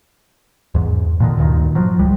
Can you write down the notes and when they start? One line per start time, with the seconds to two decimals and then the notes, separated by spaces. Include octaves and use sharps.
0.75 E2 G#2
1.20 A#2 D3 D#3
1.38 D2 G2 A#2 D#3
1.75 F3 F#3
1.99 C#2 G3 G#3